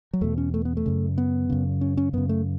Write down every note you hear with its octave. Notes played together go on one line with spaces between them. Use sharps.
F#3
E2 B2 A3
C#4
A3
B3
A3
F#2 C#3
B3
F#2 C#3
C#4
C#4
F#2 C#3 B3
A3